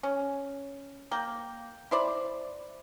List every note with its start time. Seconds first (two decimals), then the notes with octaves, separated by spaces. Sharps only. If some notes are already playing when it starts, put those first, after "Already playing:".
0.03 C#4
1.11 A#3 G5
1.91 E4 C5 D5